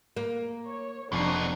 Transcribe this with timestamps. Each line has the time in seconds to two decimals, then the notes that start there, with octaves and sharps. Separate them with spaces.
0.17 A#3
0.66 C#5
1.12 F1 D#2 B2 C4 D4 A#5 C7